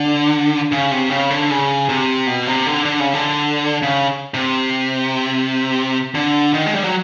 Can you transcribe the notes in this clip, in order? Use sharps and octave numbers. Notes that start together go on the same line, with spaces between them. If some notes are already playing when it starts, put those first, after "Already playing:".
Already playing: D3
C#3
C3
C#3
D3
C#3
C3
B2
C3
D3
D3
C#3
D3
C#3
C3
D3
D#3
G#3
G3
F#3